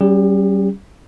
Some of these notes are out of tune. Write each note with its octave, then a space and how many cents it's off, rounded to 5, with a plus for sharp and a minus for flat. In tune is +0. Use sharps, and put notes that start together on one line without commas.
G3 -25 C#4 +0 G4 +40